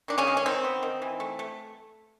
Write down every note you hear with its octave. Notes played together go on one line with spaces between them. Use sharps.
D#3 D4
C#3 C#4
G#3
C#4
D#3 C4
B3
D#3
E3
A3
A3